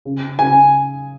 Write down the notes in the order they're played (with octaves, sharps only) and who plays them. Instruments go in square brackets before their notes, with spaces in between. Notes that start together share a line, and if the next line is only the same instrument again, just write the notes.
[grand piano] C#3
[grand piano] C#3 [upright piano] G#5